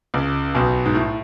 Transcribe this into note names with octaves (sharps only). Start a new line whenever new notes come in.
C#2 C#3
B1 B2
G#2
A2